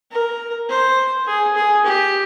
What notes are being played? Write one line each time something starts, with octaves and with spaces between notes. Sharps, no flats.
A#4
C5
G#4
G#4
G4